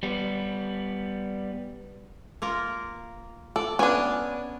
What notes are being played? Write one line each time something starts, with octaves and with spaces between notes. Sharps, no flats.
G3 B3
A#3 F4 A#4
A4 D5
B3 C#4 D4 G#5